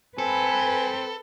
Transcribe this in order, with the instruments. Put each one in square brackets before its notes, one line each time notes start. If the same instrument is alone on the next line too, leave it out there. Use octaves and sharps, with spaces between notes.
[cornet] C4 [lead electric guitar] A4 [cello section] B4 [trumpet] G#5